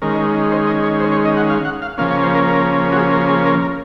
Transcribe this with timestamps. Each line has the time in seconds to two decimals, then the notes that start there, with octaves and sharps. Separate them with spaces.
0.02 D#3 G#3 C#4 A#4
0.51 C5
0.67 D#5
0.83 C#5
1.00 C5
1.12 C#5
1.25 D#5
1.37 F#5
1.50 F5
1.65 F#5
1.82 F5
1.98 C#3 F3 A#3 C#4 F5
2.11 C#5
2.23 C5
2.35 A#4
2.48 A#4
2.92 F#4
2.96 G#4
3.13 A#4
3.29 G#4
3.46 A#4
3.62 A#4